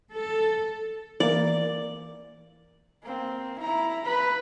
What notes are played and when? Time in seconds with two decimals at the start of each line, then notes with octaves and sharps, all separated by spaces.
0.13 A4
1.20 E3 A#3 D5
3.02 A#3 C4
3.59 E4 A#5
4.05 B4 B5